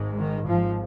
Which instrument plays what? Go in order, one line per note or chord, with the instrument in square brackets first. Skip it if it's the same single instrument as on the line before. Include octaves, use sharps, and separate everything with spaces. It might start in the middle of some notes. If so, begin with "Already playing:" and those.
Already playing: [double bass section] G#1 G#2
D#3
G#1 G#2 F3